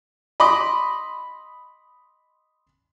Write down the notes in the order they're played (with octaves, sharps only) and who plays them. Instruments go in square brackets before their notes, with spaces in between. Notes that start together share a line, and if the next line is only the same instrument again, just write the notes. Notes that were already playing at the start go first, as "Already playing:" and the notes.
[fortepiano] D#5 B5 C6 D6